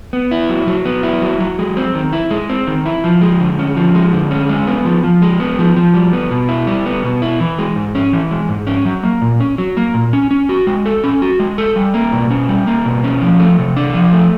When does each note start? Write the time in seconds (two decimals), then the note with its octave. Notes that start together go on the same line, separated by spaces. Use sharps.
0.13 B3
0.31 E4
0.49 F#3
0.67 F#3
0.85 B3
1.03 E4
1.22 F#3
1.40 F#3
1.59 G#3
1.77 C4
1.95 D#3
2.13 E4
2.31 G#3
2.49 C4
2.67 D#3
2.86 E4
3.04 F3
3.21 G#3
3.40 D3
3.59 C#4
3.76 F3
3.95 G#3
4.13 D3
4.31 C#4
4.49 G#3
4.67 B3
4.85 F3
5.04 F3
5.22 G#3
5.40 B3
5.59 F3
5.76 F3
5.94 G3
6.13 B3
6.31 B2
6.49 E4
6.67 G3
6.86 B3
7.03 B2
7.22 E4
7.40 E3
7.59 G#3
7.76 G#2
7.95 C#4
8.13 E3
8.31 G#3
8.49 G#2
8.67 C#4
8.85 F#3
9.03 A#3
9.21 A#2
9.40 C#4
9.58 F#3
9.77 A#3
9.94 A#2
10.13 C#4
10.31 C#4
10.49 F#4
10.67 G#3
10.86 A4
11.04 C#4
11.22 F#4
11.40 G#3
11.58 A4
11.76 G3
11.94 A#3
12.12 B2
12.30 C#4
12.49 G3
12.67 A#3
12.85 B2
13.04 C#4
13.22 F3
13.39 A3
13.58 C3
13.77 D4
13.94 F3
14.13 A3